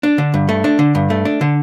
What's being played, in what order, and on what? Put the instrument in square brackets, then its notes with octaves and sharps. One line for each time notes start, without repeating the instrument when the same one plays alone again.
[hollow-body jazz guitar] D4
D3
G2
A3
D4
D3
G2
A3
D4
D3